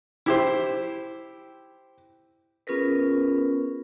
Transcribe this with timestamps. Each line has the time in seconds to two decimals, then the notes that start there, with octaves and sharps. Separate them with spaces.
0.26 E4 G4 C5
2.67 B3 C#4 F4 G#4 A#4 B4